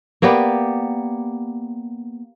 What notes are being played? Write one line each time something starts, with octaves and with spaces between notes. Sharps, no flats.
A#3 B3 G4 D5